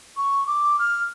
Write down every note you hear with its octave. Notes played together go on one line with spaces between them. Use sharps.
C#6
D6
F6